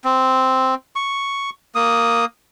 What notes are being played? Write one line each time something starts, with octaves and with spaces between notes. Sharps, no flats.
C4
C#6
A#3 D#6